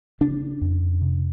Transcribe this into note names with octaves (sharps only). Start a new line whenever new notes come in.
C#3 D4
F2
C3